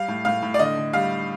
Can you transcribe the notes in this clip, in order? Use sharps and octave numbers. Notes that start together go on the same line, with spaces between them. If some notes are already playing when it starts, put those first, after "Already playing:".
Already playing: G3 F5
A2
A2 F5
A2
D5
D3 D#5
D3
G3 F5